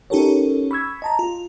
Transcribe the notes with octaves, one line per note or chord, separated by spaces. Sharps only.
C#4 D#4 G4 A4 A#4 C#5
B5 C#6 E6 G#6
D#5 A5 A#5
F4